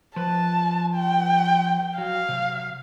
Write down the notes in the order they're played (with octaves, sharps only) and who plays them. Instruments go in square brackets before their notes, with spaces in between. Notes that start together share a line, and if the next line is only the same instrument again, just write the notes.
[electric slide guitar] F3 B4 [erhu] A5
[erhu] G5
[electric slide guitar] F#3 [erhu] F5
[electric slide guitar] C3 F#3